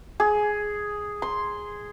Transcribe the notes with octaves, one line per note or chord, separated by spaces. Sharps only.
G#4
C6